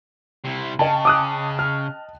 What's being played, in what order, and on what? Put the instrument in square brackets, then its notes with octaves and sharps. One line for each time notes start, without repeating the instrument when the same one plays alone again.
[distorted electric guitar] C3 E4
[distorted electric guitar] C#3 [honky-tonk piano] D#5 G5 A5
[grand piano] D6 D#6 F#6
F6